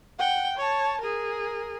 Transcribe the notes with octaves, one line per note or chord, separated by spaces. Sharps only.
F#5 G5
C#5 A5
G#4 A#4